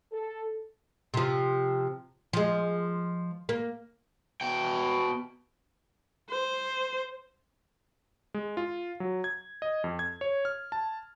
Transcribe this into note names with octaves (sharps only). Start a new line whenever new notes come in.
A4
C3 F3
F3 G#3
A#3
B2 G5
C5
G#3
F4
F#3
G#6
D#5
F2
G#6
C#5
F6
A5